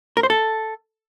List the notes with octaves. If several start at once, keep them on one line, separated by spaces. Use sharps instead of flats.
A#4
C5
A4